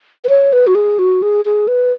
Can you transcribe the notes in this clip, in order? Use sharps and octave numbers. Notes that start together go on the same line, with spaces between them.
B4
C#5
B4
F#4
G#4
F#4
G#4
G#4
B4